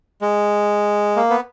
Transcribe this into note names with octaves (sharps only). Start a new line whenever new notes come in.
G#3
A#3
B3